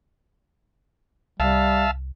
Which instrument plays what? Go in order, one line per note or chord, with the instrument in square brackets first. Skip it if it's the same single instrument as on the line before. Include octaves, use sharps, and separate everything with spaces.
[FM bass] C2 [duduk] G3 [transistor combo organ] E5 F5 A5